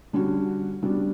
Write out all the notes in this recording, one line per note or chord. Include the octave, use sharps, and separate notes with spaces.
D3 G3 C#4 F#4
C#3 G3 B3 D4 F#4